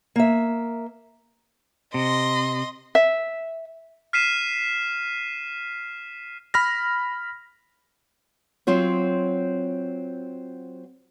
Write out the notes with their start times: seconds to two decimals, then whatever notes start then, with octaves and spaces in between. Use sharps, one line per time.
0.16 A#3 E5
1.94 C3 D#5 C6
2.95 E5
4.13 F6 B6 C7 D#7 E7
6.54 B5 F6 A#6
8.67 F#3 C4 F4 C#5